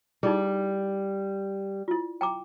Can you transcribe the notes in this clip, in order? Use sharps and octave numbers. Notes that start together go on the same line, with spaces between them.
G3 D#4 E4 G#4
E4 F4
G5 A#5 D6